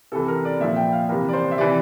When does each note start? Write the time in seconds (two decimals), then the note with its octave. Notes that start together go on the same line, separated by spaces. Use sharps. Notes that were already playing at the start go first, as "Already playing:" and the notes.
0.12 C3 E3 A4
0.28 A#4
0.45 D5
0.60 A#2 F3 E5
0.76 G5
0.93 F5
1.09 C3 E3 A#4
1.29 D5
1.33 C5
1.51 E5
1.58 C3 E3 D5